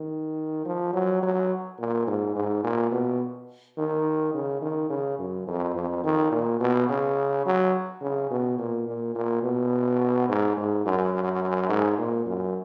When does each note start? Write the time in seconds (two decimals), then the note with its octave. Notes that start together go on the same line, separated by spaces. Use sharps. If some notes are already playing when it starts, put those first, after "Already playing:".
Already playing: D#3
0.66 F3
0.94 F#3
1.23 F#3
1.79 A#2
2.07 G#2
2.36 G#2
2.64 A#2
2.92 B2
3.78 D#3
4.34 C#3
4.62 D#3
4.90 C#3
5.19 F#2
5.47 F2
5.76 F2
6.04 D#3
6.32 A#2
6.60 B2
6.89 C#3
7.46 F#3
8.01 C#3
8.31 B2
8.59 A#2
8.87 A#2
9.15 A#2
9.43 B2
10.29 G#2
10.57 G#2
10.85 F#2
11.69 G#2
11.98 A#2
12.26 F#2